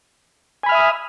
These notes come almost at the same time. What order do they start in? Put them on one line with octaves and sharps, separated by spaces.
G#5 B5 F6 E5 D#6